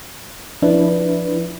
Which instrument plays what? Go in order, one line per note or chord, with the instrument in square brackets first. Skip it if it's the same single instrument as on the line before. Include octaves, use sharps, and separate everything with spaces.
[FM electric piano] F3 D4 E4 B4